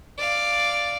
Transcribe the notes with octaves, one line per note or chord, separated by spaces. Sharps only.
D5 F5